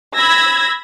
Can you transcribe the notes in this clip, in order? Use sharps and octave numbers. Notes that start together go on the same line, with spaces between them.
B5 E6 G#6 A#6